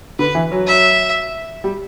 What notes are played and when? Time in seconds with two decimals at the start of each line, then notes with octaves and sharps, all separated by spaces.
0.19 D3 B4
0.35 E3
0.51 F#3
0.67 E5
1.64 G3